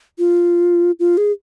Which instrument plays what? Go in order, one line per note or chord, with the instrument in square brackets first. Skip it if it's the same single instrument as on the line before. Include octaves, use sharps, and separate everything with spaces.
[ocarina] F4
F4
G#4